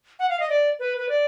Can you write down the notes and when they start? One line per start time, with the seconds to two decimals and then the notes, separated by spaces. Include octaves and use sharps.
0.19 F#5
0.29 F5
0.40 D#5
0.50 D5
0.79 B4
0.98 B4
1.09 D5